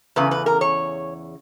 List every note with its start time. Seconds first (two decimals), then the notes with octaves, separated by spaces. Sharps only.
0.16 E2 C#3 B4
0.31 B4
0.46 A#4
0.61 C#5